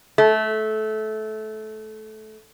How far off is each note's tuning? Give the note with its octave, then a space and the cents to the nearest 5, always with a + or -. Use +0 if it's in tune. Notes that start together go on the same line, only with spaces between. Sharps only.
A3 -20